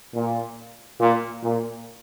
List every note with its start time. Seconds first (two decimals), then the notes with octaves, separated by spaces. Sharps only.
0.16 A#2
1.00 A#2
1.44 A#2